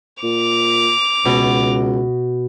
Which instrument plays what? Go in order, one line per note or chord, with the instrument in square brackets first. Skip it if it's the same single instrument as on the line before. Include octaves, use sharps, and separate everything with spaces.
[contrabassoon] A#2 [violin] D6 F7
[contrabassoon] C#2 [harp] B2